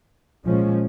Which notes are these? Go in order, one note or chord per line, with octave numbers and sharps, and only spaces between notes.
A#2 F3 G#3 C#4